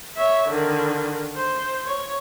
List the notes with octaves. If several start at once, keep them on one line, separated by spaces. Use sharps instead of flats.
C#5 E5
D3 D#3
C5
C#5